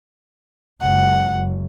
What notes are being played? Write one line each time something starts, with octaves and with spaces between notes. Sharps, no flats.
F#1 C#2 F#5
F#1